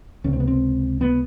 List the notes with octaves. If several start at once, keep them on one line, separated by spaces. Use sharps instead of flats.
C#2 C3 C#4
C4
B3
C4
B3